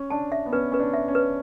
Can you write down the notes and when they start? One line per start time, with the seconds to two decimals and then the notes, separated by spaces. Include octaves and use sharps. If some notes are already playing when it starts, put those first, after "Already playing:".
Already playing: C#4
0.10 D4 A5
0.32 E5
0.46 B3
0.53 C#4 B4
0.72 C#4 B4
0.80 D4
0.93 E5
1.08 C#4
1.15 B4